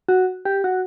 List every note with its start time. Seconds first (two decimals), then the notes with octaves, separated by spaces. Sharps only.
0.09 F#4
0.45 G4
0.64 F#4